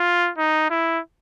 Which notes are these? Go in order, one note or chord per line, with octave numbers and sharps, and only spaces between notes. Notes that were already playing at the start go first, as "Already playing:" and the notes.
Already playing: F4
D#4
E4